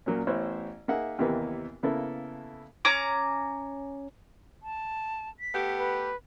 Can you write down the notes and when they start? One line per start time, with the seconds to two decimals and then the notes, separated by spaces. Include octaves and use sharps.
0.06 A#2 F#3 A#3 C#4
0.27 A1 B3 E4 C5 C#5 F#6
0.88 A#3 D#4 G#4 E5 F#5
1.19 D#2 C3 E3 A#3 B3
1.83 C#3 A#3 B3 E4 A4
2.85 C#4 A#5 D6
4.63 A5
5.40 B6
5.54 A3 B3 G4
5.78 B4